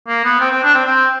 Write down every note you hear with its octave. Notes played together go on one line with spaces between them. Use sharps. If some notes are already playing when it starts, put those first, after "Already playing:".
A#3
B3
C4
C4
D4
C4
C4